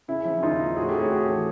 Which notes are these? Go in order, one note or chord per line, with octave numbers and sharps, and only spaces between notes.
C#3 E4
F3
D#2 D#4 F4
D#2
A2 F#4 G#4
G4 A4
A2
F#4 G#4
A2 G4 A4
E3